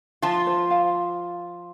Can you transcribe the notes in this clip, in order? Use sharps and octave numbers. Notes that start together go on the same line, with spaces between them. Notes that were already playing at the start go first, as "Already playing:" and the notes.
F3 F4 A5
C5
F5